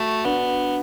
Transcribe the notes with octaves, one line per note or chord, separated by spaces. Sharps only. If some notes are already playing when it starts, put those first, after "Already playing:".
Already playing: A3 F#4
B3 D4